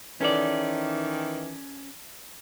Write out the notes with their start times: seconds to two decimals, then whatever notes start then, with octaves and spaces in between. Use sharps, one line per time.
0.21 D#3 E3 C#4 A4 D5